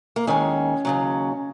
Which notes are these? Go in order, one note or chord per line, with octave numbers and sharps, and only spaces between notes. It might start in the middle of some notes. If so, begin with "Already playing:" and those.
A#3
D#2 D#3 G#3 C#4
D#2 C#3 F#3